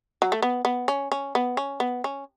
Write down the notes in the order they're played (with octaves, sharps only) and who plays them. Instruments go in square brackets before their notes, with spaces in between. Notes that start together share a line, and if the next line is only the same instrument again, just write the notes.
[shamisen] F#3
A3
B3
B3
C#4
C#4
B3
C#4
B3
C#4